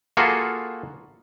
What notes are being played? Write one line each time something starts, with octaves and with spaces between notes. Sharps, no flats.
A#3 F4 F#4 G#4 A4 B4